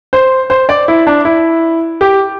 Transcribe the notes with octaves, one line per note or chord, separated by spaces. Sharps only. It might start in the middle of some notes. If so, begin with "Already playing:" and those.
C5
C5
D5
E4
D4
E4
G4